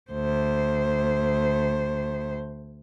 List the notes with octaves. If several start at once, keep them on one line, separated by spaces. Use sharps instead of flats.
D2 C5